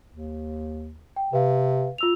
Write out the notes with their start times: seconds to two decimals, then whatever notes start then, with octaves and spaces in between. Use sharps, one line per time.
0.09 D#2
1.16 G5
1.33 C3 B4 F5
1.98 F4 E6 F7